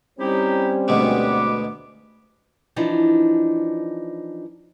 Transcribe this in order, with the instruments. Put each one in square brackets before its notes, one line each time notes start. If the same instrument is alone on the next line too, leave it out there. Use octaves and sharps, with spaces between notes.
[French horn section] G3 C4 C#4 [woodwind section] D#4 E4 G4
[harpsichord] D2 B2 G#3 [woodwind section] B3 B4 D6
[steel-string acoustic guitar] E3 F3 D4 D#4